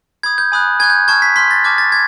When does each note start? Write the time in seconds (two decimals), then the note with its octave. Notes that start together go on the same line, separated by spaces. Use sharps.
0.23 B5 D#6 G6 G#6
0.38 G6
0.52 G#5 B5 D#6 F#6
0.80 G#5 C#6 F#6 G#6
0.90 G6
1.08 A5 C#6 F6 G#6
1.22 B6
1.36 C6 F6 B6
1.51 A6
1.64 A5 D6 F6 G#6
1.78 A6
1.92 G#6